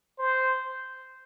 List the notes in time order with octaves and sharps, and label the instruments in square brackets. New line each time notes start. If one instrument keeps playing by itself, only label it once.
[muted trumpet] C5